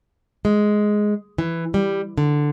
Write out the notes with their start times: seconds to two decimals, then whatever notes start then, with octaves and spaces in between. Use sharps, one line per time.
0.45 G#3
1.38 E3
1.74 G3
2.18 D3